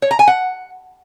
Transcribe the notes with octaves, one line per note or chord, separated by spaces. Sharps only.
C#5
A#5
G#5
F#5